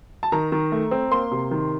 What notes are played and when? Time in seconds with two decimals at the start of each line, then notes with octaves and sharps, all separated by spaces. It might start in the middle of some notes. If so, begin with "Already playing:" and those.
0.23 A5
0.32 D#3 A#5
0.52 D#3
0.72 A3
0.91 C4
1.11 A#3 C6
1.31 C3
1.51 D#3